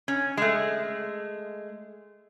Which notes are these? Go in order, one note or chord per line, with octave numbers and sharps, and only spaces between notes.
C#4
G#3 A3